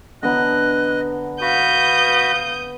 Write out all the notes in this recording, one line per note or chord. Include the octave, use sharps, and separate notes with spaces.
D3 B3 D#5 A#5 F#6
F#4 B4 F5 D#6 G6